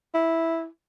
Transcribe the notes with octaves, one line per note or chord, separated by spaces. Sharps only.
E4